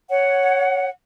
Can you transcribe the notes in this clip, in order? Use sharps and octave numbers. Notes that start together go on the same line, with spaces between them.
C#5 F#5